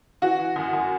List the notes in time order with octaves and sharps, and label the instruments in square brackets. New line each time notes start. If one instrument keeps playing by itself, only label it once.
[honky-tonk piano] E3 F#4
E3
F#2
F#2